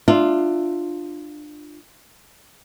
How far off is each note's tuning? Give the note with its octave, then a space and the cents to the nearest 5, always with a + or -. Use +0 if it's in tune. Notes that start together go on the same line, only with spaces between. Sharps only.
D4 +25 F4 +0 E5 +10